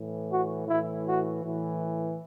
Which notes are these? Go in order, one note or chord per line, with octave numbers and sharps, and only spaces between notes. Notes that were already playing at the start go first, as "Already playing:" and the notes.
Already playing: A2 E3
F#4
A2 E3 E4
F#4
A2 E3